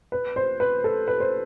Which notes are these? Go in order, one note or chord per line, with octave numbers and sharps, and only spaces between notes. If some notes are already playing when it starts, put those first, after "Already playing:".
B4
C5
B4
A4
B4
C5